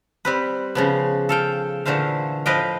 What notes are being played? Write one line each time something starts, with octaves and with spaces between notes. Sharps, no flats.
G3 C4 B4
C#3 F3 B3
A4 F5 G5
A#2 D3 E3 A3 C5 F5
A2 F3 B4 D#5 F5 G5